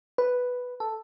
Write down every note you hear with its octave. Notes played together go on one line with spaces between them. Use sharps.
B4
A4